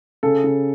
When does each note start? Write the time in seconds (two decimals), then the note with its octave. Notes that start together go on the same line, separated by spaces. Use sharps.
0.23 C#3 A4
0.44 C#3